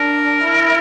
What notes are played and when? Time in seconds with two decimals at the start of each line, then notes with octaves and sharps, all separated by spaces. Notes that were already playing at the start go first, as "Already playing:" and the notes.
Already playing: D4 A#4
0.44 E4